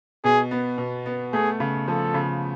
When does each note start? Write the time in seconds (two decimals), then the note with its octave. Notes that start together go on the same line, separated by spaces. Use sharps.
0.24 B2 G#4
0.51 B3
0.78 B2
1.06 B3
1.33 A3 G#4
1.60 C#3
1.87 F3 A4
2.14 C#3